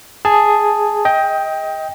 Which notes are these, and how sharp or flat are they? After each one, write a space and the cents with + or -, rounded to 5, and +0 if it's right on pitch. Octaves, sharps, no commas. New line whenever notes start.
G#4 +0 A5 +0
D#5 +25 G5 +5